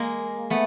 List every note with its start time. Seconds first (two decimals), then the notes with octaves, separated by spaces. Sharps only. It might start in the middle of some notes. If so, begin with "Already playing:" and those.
Already playing: G#3 A#3
0.50 A3 B3